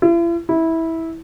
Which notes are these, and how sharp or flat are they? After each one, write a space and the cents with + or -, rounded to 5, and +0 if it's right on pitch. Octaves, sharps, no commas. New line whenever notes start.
E4 +45
E4 -15